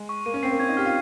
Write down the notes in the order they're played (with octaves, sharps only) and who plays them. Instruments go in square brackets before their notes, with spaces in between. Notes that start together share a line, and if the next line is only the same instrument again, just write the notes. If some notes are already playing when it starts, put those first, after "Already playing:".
Already playing: [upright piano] G#3
[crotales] C#6
[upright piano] A#3 [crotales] D#7
[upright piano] C#4
[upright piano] C4 [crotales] C7
[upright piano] A#3
[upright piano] C#4 [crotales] G#6
[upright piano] D#4
[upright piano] G4 [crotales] F6
[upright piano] F4